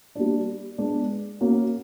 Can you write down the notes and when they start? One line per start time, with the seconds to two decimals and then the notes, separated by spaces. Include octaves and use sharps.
0.15 G3 A#3 D4
0.78 G#3 B3 D4
1.41 A#3 C#4 F#4